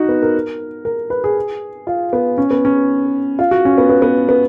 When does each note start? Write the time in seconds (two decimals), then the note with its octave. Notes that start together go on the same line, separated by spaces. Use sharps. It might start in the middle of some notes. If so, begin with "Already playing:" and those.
Already playing: D#4 F#4
0.09 B3
0.23 A#4
0.85 A#4
1.10 B4
1.24 G#4
1.87 F4
2.13 B3
2.38 C#4
2.51 B3
2.65 C#4
3.39 F4
3.51 F#4
3.65 C#4
3.78 B3
3.89 B3
4.02 B3
4.29 B3